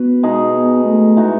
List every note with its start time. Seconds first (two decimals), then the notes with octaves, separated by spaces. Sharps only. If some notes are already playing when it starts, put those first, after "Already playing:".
Already playing: B3 F#4 B4
0.23 B2 G#3 D#4 G#4
0.55 B3
0.86 A3
1.17 E3 G#3 D#4 F#4